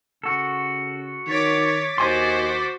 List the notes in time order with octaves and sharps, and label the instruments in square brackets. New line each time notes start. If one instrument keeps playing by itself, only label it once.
[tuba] C#3 [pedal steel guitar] F#4 A4
[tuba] D#3 [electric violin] C#5 [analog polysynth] D6 A6 B6
[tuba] D#2 [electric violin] F#4 C5 [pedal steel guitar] D#5 G#5 C6